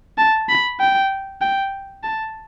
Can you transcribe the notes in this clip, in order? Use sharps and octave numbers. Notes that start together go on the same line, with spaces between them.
A5
B5
G5
G5
A5